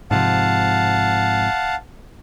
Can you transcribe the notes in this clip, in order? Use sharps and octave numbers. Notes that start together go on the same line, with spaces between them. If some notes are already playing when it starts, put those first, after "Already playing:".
G#2 C3 F3 F5 F#5 A5